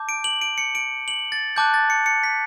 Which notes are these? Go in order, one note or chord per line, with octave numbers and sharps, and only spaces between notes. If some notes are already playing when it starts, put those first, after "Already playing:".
Already playing: A5 D6 G6
D7
F#7
D7
C#7
D7
F#7
A6
A5 D6 F#6 G6
A6
C#7
C#7
B6